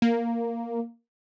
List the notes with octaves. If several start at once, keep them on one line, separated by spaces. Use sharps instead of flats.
A#3